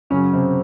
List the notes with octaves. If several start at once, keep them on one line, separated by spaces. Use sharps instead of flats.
F#2 C#3 F#3 C#4
C3 C4